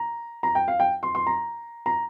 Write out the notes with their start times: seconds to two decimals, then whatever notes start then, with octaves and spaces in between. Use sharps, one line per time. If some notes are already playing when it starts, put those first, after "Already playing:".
Already playing: A#5
0.43 A#5
0.55 G5
0.68 F5
0.80 G5
1.03 C6
1.15 C6
1.27 A#5
1.86 A#5